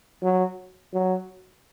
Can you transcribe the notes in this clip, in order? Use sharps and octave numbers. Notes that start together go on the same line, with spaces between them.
F#3
F#3